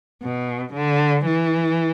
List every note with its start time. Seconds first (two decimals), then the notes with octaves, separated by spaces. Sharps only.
0.23 B2
0.74 D3
1.26 E3